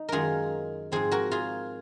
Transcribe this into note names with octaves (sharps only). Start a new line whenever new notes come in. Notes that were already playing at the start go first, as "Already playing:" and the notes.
Already playing: D#4
F#2 D#3 G#3 F4 G#4 A#4
G#2 F3 C4 G#4 C5
F#4 A#4
F4 G#4